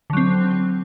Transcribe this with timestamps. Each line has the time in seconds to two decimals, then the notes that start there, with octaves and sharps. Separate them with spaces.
0.10 D3
0.13 F#3
0.17 C4